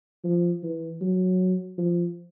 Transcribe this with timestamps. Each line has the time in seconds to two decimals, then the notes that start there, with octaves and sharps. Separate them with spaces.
0.24 F3
0.63 E3
1.01 F#3
1.78 F3